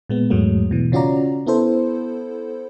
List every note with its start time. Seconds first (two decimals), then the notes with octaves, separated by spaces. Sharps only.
0.09 A#2 G#3 B3
0.30 E2 G#2 F#3 G#3 A3
0.71 B2 E3
0.92 C#3 C#4 F4 F#4 D5 A#5
1.47 B3 E4 A4 C5